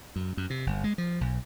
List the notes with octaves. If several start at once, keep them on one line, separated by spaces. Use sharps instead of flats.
F#2
F#2
C3
G1
G#3
F3
B1